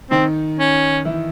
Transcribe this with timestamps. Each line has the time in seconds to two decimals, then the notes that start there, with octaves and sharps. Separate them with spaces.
0.11 D#3 C4 D#4
0.59 C#4
1.05 E3 E4